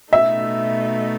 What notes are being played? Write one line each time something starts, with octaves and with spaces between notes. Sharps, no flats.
B2 A3 D#4 E5